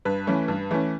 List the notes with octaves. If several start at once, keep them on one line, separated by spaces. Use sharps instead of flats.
G2 B4
E3 A3 C#4
G2
E3 A3 C#4